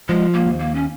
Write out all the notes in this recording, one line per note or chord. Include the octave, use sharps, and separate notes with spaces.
F3 G#3
A#3
D#2
A#3
C#4